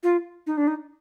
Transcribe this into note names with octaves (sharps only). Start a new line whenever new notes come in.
F4
D#4
D4
D#4